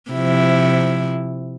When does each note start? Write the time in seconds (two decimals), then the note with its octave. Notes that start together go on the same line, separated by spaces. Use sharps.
0.11 C3 F3 E4